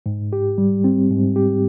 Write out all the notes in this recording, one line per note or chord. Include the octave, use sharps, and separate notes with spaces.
G#2
G4
G3
C4
G#2
G4